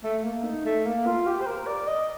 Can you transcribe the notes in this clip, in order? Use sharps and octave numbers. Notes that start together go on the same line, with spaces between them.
A3
A#3
D#4
A3
A#3
F4
G4
C5
A#4
D5
D#5